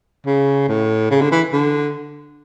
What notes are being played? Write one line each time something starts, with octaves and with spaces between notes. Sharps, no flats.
C#3
A2
C#3
D3
E3
D3